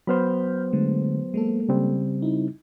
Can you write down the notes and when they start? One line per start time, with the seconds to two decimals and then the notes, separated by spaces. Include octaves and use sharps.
0.07 F#3 B3 C5 B5 F6 G6
0.73 D3 G#3 A3
1.34 G#3 A#3 A4
1.69 C#3 G3 C4
2.22 D#4 E4